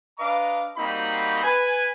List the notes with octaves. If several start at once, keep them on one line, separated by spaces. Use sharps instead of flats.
D4 B4 D#5 F5 A#5 D6
G3 A#3 C4 D#4 F#4 B5
B4 G#5